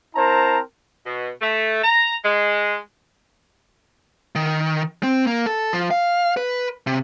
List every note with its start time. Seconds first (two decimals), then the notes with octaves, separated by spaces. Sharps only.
0.15 C4 E4 A#4 C5 A5 A#5
1.06 B2
1.41 A3
1.83 A#5
2.25 G#3
4.35 D#3
5.03 C4
5.27 A#3
5.46 A4
5.73 F3
5.91 F5
6.37 B4
6.87 C3